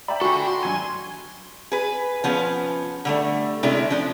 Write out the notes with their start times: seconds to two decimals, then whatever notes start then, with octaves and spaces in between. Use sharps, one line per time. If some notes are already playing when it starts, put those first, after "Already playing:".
0.08 D5 E5 G5 A#5 B5
0.21 D4 F4 F#4 A4 G#5 C#6
0.47 C6
0.63 G2 F#3 G#5 G#6
1.72 G#4 B4
2.24 F3 B3 C#4
3.05 D3 G3 A3
3.63 C3 G#3 A3 C#4 D4 E4
3.90 F3 D4